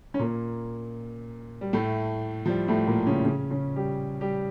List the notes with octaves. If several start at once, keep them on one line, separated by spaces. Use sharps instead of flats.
C#4
A#2 A#3
G3
A2 A3
F3
G3
A2 A3
A#2 A#3
C#3 C#4
C#3 C#4
C#3 C#4
G3 G4
G3 G4